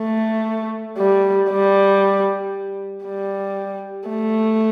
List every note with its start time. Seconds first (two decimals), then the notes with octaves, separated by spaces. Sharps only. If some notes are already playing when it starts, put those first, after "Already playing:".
Already playing: A3
0.97 G3
1.50 G3
3.05 G3
4.09 A3